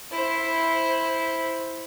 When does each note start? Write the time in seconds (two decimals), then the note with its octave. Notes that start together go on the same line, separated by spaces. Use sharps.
0.11 E4 C5